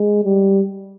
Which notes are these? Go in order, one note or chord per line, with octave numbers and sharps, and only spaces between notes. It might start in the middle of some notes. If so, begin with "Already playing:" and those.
Already playing: G#3
G3